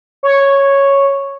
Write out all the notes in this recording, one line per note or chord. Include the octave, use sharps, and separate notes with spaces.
C#5